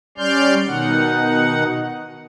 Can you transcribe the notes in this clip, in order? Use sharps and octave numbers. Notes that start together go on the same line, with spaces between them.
G3 C#4 D5 C6 F6 G6
B2 D#3 D#4 F#5